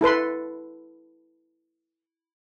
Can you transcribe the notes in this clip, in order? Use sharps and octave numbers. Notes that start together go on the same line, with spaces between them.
E4 A4 B4 C6